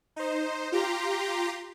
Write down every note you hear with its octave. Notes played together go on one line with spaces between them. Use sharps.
D#4 C5
F4 G4 A#5 C6